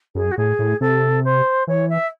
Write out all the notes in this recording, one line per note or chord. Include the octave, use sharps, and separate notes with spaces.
F#2 G#4
F#4
A2 G#4
A2
C3 A4
C5
E3 C#5
E5